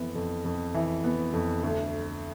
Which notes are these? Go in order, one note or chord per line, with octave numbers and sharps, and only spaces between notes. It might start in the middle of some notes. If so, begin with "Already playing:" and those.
Already playing: F2 E3 B3
F2
F2
E3
B3
F2
D2